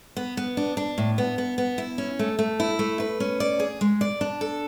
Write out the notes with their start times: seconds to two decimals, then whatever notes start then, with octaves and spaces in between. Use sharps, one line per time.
0.17 B3
0.37 B3
0.57 D4
0.77 D4
0.98 A2
1.18 B3
1.38 B3
1.58 B3
1.78 E4
1.98 C#4
2.19 A3
2.39 A3
2.60 E4
2.79 A3
3.00 B4
3.20 C#4
3.40 D5
3.60 G#4
3.81 G#3
4.01 D5
4.21 D4
4.41 A4